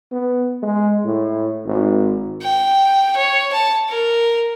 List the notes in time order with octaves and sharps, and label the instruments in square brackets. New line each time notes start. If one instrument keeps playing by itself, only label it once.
[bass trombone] B3
G#3
A2
G#1
[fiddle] G5
C#5
A5
A#4